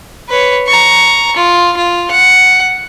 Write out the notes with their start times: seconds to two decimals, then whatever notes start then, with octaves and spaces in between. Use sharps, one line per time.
0.29 B4 C#5
0.66 A#5 C#6
1.36 F4
1.77 F4
2.11 F#5